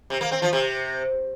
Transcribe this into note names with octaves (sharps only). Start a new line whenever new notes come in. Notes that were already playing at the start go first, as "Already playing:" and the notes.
C3
A#3
C4
F3
C3